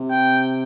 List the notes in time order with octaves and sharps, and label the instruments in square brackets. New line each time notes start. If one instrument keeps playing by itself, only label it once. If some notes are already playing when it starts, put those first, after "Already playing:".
Already playing: [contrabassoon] C3
[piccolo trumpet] G5